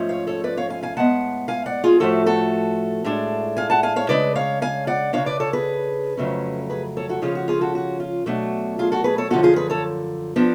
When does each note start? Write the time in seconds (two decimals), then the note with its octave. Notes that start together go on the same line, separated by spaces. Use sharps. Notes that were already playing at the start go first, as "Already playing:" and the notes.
Already playing: G#2 F3 A3 C#4
0.09 C#5 F5
0.27 A4 C#5
0.44 B4 D5
0.57 C#5 F5
0.70 F5 G#5
0.83 F5 G#5
0.97 A2 G#3 B3 F#5 A5
1.48 F5 G#5
1.66 D5 F#5
1.84 F4 G#4
2.00 A2 F3 A3 F#4 A4
2.26 F#4 A4
3.04 A2 G#3 D4
3.57 F5 G#5
3.70 F#5 A5
3.83 F5 G#5
3.96 C#5 F5
4.09 C#3 G#3 D4 B4 D5
4.35 C#5 F5
4.62 F5 G#5
4.87 D5 F#5
5.13 G#3 D4 C#5 F5
5.18 C#3
5.26 B4 D5
5.40 A4 C#5
5.53 G#4 B4
6.17 F2 C#3 F#3 A3 C#4
6.70 G#4 B4
6.97 A4 C#5
7.09 F#4 A4
7.22 C#3 F3 G#3 C#4 F4 G#4
7.35 F#4
7.48 F4 G#4
7.61 F#4 A4
7.75 F#4
8.00 F4
8.26 B2 F#3 A3 D4 F#4
8.79 F4 G#4
8.92 F#4 A4
9.04 G#4 B4
9.18 A4 C#5
9.30 F#2 D3 F3 B3 F#4 A4
9.43 F4 G#4
9.56 G#4 B4
9.70 A4 C#5
10.36 F3 B3 D4